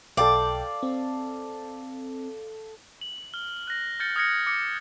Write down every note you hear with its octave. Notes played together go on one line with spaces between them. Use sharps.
B1 A4 D5 F5 G5
C4
F#7
F6 G7
F#6 A#6
F6 G6 A6 C#7 G7
D#6 F6 G#6 A#6 C#7
D6 C#7